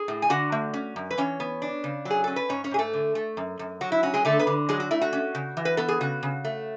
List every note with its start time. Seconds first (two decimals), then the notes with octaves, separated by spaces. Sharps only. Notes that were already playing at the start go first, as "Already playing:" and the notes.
Already playing: G#4
0.08 A2
0.22 G#5
0.30 D3 F#4 F#5
0.52 A3
0.74 C#4
0.96 F#2
1.11 B4
1.18 E3 C#4 C#5
1.40 B3
1.62 D4
1.84 C#3
2.05 F#3
2.10 G#4
2.24 C#4 A4
2.36 B4
2.49 G#2 C#4 C#5
2.64 C#4 C#5
2.71 G#2 G#4
2.79 A3 A4
2.93 D3
3.15 A3
3.37 F#2
3.59 F#2
3.81 F#3 F#4
3.92 E4
4.03 C#4 F#4
4.14 G#3 G#4
4.25 D3 A3 A4
4.39 B3 B4
4.47 D3
4.69 F#3 G#3 G#4
4.80 F#4
4.91 A3 E4
5.02 F#4
5.13 C#4
5.35 C#3
5.57 E3
5.65 B4
5.77 B3 A4
5.89 G#4
6.01 C#3 F#4
6.23 C#3
6.45 A3